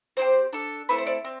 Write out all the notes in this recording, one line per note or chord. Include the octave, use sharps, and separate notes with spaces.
C4 E4 G4 C5
D4 A4
A3 C4 E4 A4 B4
C5
D5
C4